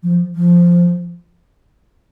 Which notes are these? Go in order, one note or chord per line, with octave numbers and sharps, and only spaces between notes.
F3
F3